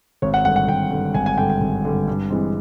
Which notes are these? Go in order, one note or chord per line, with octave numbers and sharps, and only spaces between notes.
G#1 C#5
F#5
G2 D3 F#5
F#5
G#1 G5
G2 D3
G#1 G#5
G#5
G2 D3 G5
G5
G#1
G2 D3
G2
E3 G#3 C4